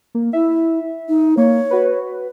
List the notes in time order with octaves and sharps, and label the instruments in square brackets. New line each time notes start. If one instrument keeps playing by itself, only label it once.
[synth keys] A#3
[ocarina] E4 [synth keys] E5
[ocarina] D#4
[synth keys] A#3 [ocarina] C#5
[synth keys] F#4 B4